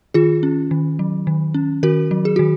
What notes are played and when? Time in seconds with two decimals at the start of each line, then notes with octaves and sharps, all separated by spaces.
0.14 D#3 F4 G#4
0.43 C#4
0.71 D#3
0.99 F#3
1.27 D#3
1.54 C#4
1.83 D#3 F#4 A#4
2.11 F#3
2.25 G#4
2.36 D#3 F#4